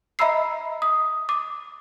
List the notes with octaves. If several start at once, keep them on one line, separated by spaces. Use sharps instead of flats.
D#5 E5 A#5 B5 E6 C7
D#6
D6